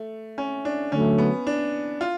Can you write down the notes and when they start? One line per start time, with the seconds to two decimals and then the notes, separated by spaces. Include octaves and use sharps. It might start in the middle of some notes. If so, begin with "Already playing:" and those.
Already playing: A3
0.38 C#4
0.65 D4
0.92 D3 F#3 A3 C#4
1.18 B3
1.47 D4
2.01 F4